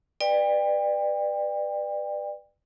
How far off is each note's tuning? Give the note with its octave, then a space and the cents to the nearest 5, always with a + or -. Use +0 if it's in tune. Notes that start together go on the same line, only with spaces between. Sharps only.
B4 +0 D5 +25 G5 +30